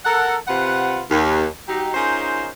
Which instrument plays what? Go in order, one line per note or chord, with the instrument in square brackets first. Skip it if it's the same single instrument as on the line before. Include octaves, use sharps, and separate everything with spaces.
[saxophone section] A4 A#4 F#5
C3 F4 B4 F#5
D#2
F#3 D#4 G4
C#4 D#4 F4 G#4 A#4 C5